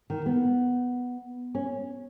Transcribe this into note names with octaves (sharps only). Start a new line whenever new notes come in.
D#3
B3
C#4